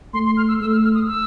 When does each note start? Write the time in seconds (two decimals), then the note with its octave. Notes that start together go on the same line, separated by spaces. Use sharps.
0.14 A3 C6
0.26 C6
0.37 F6
0.48 E6
0.61 A3 E6
0.72 F6
0.84 F6
0.95 D#6
1.07 E6